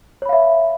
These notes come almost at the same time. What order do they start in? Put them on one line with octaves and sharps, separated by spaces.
C#5 B5 F5 E5